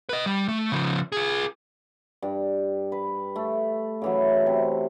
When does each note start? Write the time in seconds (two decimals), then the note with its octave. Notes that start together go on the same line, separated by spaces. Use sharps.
0.09 B4 D#5
0.26 G3
0.48 A3
0.72 C#3 F3
1.12 F4 G#4
2.22 G2
2.92 B4
3.36 A3
4.02 C#3 E3 F#3
4.46 C3